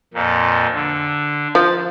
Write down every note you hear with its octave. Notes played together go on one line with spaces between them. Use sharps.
F2 A#2
D3
F3 A6